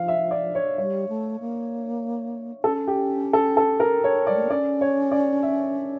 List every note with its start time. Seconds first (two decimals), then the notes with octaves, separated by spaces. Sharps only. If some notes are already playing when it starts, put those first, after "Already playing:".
Already playing: F3 F5
0.08 E5
0.31 D5
0.55 C#5
0.78 G3 C#5
1.09 A3
1.40 A#3
2.64 C#4 A4
2.87 G4
3.33 A4
3.57 A4
3.80 A#4
4.04 C#5
4.27 G3 D5
4.36 A3
4.43 A#3
4.50 C#4 D5
4.81 C#5
5.11 D5
5.43 E5